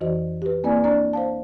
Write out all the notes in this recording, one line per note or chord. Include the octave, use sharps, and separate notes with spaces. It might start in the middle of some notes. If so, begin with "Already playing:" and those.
F2 E3 F#4 C5 D#5
G4 B4
A#3 C4 E4 D5 G#5
D4 D5 A#5
C5 F5 A5